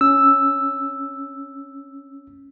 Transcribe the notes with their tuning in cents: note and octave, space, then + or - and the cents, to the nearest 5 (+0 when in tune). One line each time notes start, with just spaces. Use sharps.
C#4 +0 E6 +0